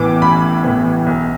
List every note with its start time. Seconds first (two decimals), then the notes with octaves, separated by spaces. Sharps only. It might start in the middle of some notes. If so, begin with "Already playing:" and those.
Already playing: A1 A2 E3 B3 D6
0.22 A1 B5
0.64 A2 E3 B3
1.06 B1